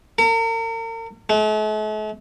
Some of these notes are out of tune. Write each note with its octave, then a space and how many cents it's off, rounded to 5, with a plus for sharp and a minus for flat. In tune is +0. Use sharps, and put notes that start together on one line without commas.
A#4 -40
A3 -45